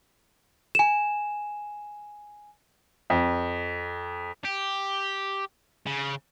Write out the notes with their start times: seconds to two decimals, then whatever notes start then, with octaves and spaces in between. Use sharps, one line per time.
0.75 G#5 E7
3.10 F2
4.45 G4
5.86 C#3